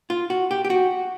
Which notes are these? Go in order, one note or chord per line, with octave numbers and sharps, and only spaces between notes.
F4
F#4
G4
G4
F#4